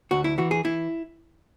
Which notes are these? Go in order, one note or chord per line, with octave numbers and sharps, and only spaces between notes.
D2 F#4
E4
E3 F#4
G#4
E3 E4